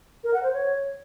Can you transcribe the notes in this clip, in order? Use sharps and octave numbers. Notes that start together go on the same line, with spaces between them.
A#4
F#5
C5
C#5